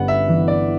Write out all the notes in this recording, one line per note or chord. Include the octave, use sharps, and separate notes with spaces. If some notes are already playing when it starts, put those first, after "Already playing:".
Already playing: G1 G2 B3 F#5
E5
E3
D5